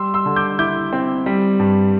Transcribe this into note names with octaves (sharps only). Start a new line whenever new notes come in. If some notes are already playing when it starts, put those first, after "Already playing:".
Already playing: G3 C6 E6
C6 E6
D3
D6 G6
E4 D6 G6
C4
G3
G2